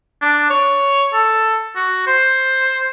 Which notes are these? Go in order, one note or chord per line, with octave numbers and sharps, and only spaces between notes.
D4
C#5
A4
F#4
C5